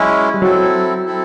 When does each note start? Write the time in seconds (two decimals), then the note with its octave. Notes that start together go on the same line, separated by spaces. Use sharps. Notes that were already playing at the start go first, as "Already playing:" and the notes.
Already playing: F#3 G#3 C#4 E4
0.34 G3
0.42 F#3 C4 E4 A4
1.06 C4 E4 A4